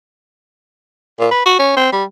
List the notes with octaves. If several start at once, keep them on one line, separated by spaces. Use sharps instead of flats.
A#2
B4
F#4
C#4
C4
G3